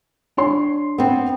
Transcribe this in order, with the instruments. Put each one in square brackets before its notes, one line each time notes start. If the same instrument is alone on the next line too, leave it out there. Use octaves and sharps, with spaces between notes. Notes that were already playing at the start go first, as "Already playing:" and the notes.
[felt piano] D4 C#5 C6
[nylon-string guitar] B3 C4